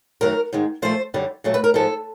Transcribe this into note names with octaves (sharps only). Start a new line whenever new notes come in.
F#2 D#3 F#3 A3 A#4
G#2 D#3 G#3
A#2 F3 A3 C5
F#2 D3 G3
A#2 F#3 A3
B4
A#4
G#2 F3 G#3 A4